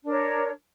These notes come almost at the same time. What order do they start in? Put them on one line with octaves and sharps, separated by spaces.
D4 A#4 C#5